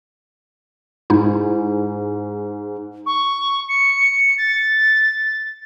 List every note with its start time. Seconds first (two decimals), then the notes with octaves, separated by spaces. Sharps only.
1.10 G#2 D#4 E4
3.06 C#6
3.69 C#7
4.38 A6